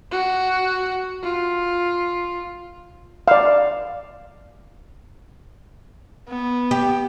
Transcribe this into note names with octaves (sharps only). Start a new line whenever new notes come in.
F#4
F4
D5 F5
B3
G4